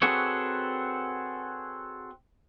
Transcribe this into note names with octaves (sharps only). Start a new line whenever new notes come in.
C4 F#4 G#4 A4 B4 C#5